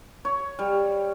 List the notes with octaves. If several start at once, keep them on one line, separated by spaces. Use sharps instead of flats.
C#5
G3